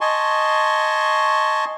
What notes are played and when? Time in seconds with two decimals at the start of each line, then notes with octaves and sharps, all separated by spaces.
0.01 D#5 G#5 A5 C6 C#6